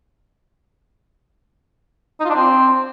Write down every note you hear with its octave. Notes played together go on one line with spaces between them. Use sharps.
D#4
F4
D4
C4